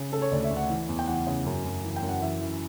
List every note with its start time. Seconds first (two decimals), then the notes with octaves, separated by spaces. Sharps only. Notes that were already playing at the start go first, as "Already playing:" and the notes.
Already playing: C#3
0.13 C#3 A4
0.22 C#5
0.31 D2 D5
0.44 E5
0.51 D2
0.57 F#5
0.70 E3
0.89 E2
0.99 G5
1.08 E3 F#5
1.27 C#3
1.46 F#2
1.65 F#2
1.84 E3
1.96 G5
2.02 F#2
2.09 F#5
2.21 E3 E5
2.41 E3